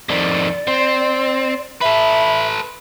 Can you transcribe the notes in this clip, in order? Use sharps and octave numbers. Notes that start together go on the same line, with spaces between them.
F2 D#3 D5
C4
A4 B4 E5